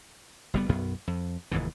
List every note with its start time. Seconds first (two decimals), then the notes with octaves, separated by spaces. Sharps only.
0.54 F#1 G3 B3
0.69 B1 F#2 B3
1.07 F2
1.51 F1 D#2 G#2 E3